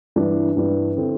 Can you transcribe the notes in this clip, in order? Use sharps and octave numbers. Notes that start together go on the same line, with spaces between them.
G2 E3 G3 D4
G2 E3 G3 D4
D3 C4 E4